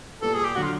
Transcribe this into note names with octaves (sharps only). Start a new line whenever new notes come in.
A#2 G3 B3 A4
G#4
G4
D3 F#3 F#4
F4